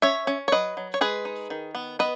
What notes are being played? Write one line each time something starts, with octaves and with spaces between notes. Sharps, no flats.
C#4 C#5 E5
C#4
C#5
F#3 B4 D#5
F#3
C#5
G#3 G#4 B4
D#4
D#3
B3
B3 B4 D#5